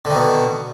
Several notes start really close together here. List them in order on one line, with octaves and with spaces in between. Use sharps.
D3 D#3 B2